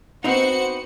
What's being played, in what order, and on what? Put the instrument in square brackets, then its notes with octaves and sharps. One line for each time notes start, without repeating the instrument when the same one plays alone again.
[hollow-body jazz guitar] B3 C4 D#4 [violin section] F#4 C5 C#7